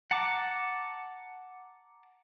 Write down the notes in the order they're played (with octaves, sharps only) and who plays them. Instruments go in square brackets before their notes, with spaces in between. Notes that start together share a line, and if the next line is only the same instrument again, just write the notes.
[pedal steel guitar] F#5 A5 A#5 D6